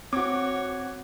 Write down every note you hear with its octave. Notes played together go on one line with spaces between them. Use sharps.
C4 F#4 C#5 D6